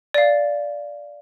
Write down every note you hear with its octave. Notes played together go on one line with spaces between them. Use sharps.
D5 F5